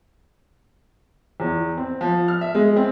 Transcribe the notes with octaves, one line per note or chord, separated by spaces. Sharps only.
E2
C4
F3
F6
E5
G#3
C4